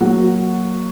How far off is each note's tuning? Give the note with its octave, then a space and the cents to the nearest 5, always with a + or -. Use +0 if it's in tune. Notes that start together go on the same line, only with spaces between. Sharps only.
F#3 +0 A#3 +0 F#4 +0